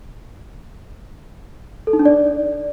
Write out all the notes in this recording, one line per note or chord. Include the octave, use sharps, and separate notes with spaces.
A4
D#4
D4
D5